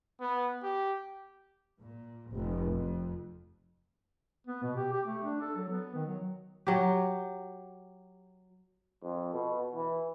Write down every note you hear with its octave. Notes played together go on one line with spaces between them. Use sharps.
B3
G4
A#2
F1
F2
B3
B2
G4
G4
A3
D4
A4
F#3
B3
D#3
F#3
F#3 G4
F2
B2
E3